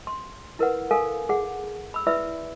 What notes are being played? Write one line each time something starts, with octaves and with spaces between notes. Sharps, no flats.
C6
E4 A#4 B4 F#5
A4 A#4 F5 G#5
G#4 F#5
B5 E6
E4 B4 D5 E5 B5 E6